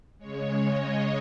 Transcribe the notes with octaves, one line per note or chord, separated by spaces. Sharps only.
C#3 G#3 C#5
D#5